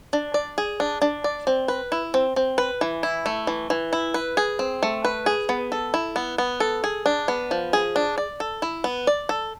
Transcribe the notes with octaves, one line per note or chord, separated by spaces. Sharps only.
D4
D5
G#4
D4
D4
D5
C4
B4
E4
C4
C4
B4
E3
E4
A3
E3
E3
E4
B4
G#4
C4
A3
B4
G#4
B3
A4
E4
B3
B3
A4
G#4
D4
B3
F3
G#4
D4
D5
A4
E4
B3
D5
A4